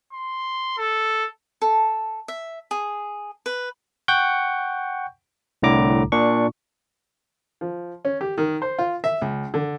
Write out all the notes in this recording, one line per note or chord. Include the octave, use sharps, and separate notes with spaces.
C6
A4
A4
E5
G#4
B4
F#5 G5 C#6 G6
C2 A2 D3 A#5 D6
A#2 D4 C#6
F3
C#4
G4
D#3
C5
F4
E5
C#2
D3